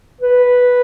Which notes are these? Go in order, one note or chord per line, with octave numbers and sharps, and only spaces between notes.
B4